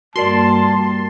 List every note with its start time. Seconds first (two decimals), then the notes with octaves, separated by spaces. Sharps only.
0.16 G2 G3 A#3 F#4 A#4 D5 A5 C6